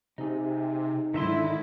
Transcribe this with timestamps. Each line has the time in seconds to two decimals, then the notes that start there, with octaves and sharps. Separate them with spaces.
0.18 C3 D#4 G#4
1.14 G#2 D3 D#3 E4 E5 C6